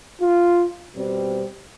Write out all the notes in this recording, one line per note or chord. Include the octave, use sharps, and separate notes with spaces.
F4
B2 G3 C4